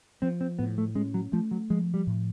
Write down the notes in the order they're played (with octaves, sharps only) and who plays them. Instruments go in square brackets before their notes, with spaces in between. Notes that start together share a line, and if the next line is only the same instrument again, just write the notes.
[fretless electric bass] F3 [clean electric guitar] C4
[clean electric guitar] C4
[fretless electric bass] A2 [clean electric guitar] B3
[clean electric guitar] A3
[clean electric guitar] G#3 [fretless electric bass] C#4
[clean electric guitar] F#3
[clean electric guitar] F3 [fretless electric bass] A3
[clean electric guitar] F#3
[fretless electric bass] F3 [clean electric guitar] G#3
[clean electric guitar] G3
[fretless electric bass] A2